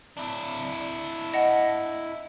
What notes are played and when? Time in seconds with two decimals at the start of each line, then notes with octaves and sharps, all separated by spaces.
0.17 D4 E4
1.34 D#5 F#5